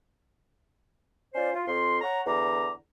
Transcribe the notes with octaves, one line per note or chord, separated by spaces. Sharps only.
C#4 F4 C5 D5
F4
F2 C6
C#5 F#5 A#5
E2 D3 A#5 D6